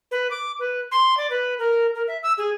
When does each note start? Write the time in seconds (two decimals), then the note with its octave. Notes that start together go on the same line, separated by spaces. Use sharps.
0.11 B4
0.31 D6
0.59 B4
0.91 C6
1.17 D5
1.30 B4
1.59 A#4
1.95 A#4
2.08 E5
2.23 E6
2.38 G#4